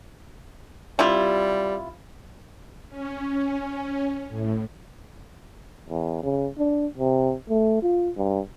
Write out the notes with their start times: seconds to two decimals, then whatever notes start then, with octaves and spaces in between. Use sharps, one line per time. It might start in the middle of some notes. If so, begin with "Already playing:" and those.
0.99 C3 G3 E4 F4
2.88 C#4
4.28 A2
5.90 E2
6.23 C#3
6.58 D4
6.98 C3
7.49 A3
7.82 F4
8.16 G2